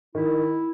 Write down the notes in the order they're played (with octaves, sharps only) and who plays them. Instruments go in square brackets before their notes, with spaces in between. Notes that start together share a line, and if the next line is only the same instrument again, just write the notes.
[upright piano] D#3 [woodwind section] E4